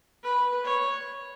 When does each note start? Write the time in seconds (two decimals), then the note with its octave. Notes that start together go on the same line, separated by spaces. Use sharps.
0.23 B4
0.65 C#5